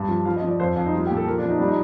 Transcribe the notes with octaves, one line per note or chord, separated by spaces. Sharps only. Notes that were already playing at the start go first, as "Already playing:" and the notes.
Already playing: G2
F3
F3 F5
D#5
F3
D5
F2 C5
F2
D#4
G3 F4
A#2 G4
A4
F3 A#4
D4
F3
D#4
G3 D4
D#4